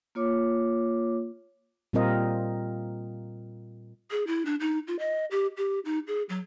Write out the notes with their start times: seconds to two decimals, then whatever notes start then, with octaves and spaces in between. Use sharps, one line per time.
0.15 A#3 F4 C#5 D6
1.93 A#2 G3 C4 F4 A#4 D#5
4.11 G#4
4.27 E4
4.45 D4
4.60 D#4
4.88 F4
4.99 D#5
5.31 G4
5.57 G4
5.85 D#4
6.07 G#4
6.29 F#3